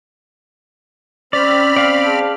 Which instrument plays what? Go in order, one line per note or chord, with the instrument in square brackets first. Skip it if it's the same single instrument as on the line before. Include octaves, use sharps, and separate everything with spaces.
[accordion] C4 B5 F6 [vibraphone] C#4 [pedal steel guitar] D5
[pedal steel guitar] D5 F5
[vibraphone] G#4 A5